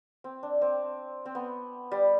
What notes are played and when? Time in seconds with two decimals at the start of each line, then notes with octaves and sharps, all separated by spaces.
0.24 C4
0.43 D4
0.61 C4
1.26 C4
1.35 B3
1.92 G3